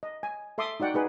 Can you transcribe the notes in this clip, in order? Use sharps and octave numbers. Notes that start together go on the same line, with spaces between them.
D#5
G#5
A4 E5 C6 D6 D#6
D#4 F#4 D5 F#5 G5
D#4 G#4 B4